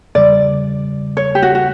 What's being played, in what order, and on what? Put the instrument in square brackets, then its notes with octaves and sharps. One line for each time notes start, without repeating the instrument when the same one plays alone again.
[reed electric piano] E2 C#3 G3 [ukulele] D5
[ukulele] C#5
G4
F#4
F#4